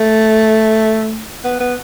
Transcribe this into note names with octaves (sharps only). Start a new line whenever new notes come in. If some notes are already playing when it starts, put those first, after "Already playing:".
Already playing: A3
B3
B3